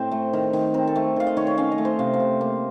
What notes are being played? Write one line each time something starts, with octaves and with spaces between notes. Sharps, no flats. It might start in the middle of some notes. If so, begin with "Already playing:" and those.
Already playing: A2 C4 C5 D#5
A3
D#3
D#3
C4 A#4
A4
A3
D#3 F5
D#5
D#3 C#5
C#5
C#4 F5
D#5
A3
C5
C3 F5
F5
C3
A#3